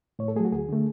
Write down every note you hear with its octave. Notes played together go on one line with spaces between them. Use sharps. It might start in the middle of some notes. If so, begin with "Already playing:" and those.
A2 C#5
A4
F#3 A3 G#4
F#4
D2 G#4
D3 A3